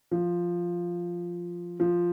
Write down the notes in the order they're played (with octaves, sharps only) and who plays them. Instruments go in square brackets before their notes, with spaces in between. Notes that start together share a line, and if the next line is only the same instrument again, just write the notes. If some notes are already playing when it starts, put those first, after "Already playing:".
[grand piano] F3
F3